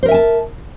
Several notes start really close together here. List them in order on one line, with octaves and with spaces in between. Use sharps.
C5 A#4 E5 G#5 A5